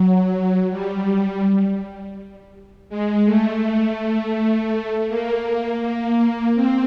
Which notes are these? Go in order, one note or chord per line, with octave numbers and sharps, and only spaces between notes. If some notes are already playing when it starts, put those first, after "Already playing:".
Already playing: F#3
G3
G#3
A3
A#3
A#3
C4